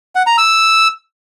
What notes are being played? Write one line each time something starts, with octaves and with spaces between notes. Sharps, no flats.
F#5
A#5
E6